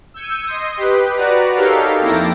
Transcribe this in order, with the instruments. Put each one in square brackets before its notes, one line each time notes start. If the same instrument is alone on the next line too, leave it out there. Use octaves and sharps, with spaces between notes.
[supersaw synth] E6 G6 G#6 C#7 D#7
D#5 C6 D#6
G4 B4
F#4 B4 D5 A#5
D#4 G4 A4 A#4 C#5 F5
F2 A#3 E4 G5 A6 A#6